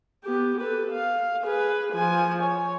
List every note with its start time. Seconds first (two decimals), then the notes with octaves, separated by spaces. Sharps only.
0.25 B3 G4
0.61 A4 B4
0.92 F5
1.43 G#4 B4
1.93 F3 G#5
2.43 C#5